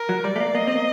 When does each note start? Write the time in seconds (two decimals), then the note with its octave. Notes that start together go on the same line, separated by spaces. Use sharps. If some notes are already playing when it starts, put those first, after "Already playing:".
Already playing: A#4
0.09 F#3
0.24 G3 D5
0.36 A3
0.40 A#3
0.55 A#3 D#5
0.67 C4
0.75 A#3